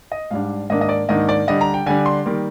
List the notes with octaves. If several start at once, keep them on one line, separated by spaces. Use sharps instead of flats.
D#5
G#2 G3 D4 F5
G#2 D#3 A#3 D4 D#5
D#5
D5
G#2 D#3 A#3 D4 D#5
D5
D3 G3 D4 D#5
A#5
G5
D3 G3 D4 G#5
C6
D#3 G3 A#3